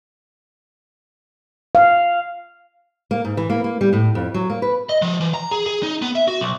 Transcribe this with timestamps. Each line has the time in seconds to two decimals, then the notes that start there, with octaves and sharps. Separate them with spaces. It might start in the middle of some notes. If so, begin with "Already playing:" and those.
1.75 F5
3.11 A#3
3.25 G#2
3.37 E3
3.50 A#3
3.64 A#3
3.81 G3
3.93 A2
4.15 F2
4.34 F#3
4.50 A#3
4.62 B4
4.89 D#5
5.02 F3
5.21 E3
5.34 A#5
5.51 G#4
5.66 G#4
5.83 D#4
6.02 B3
6.15 E5
6.28 F#4
6.41 B1